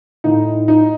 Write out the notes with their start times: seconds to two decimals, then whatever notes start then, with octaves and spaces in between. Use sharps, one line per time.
0.24 A2 D#4
0.68 D#4